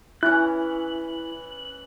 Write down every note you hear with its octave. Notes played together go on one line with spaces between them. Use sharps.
E3 C#4 E4 F#6